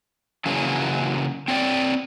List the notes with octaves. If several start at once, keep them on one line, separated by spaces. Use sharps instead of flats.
C#3 E3 F#3 A#3 C#4
C4 C#5 D5 G5